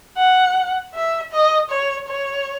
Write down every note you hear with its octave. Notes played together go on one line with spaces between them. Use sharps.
F#5
E5
D#5
C#5
C#5